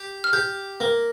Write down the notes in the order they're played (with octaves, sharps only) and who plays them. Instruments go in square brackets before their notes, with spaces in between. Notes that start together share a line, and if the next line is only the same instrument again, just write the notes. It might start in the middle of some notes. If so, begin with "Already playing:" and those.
Already playing: [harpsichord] G4
[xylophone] F6
[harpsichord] G4 [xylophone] G6
[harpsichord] A#3